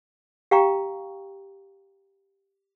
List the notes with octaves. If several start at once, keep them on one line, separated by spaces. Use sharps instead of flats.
G4 F5 G5 A#5 C#6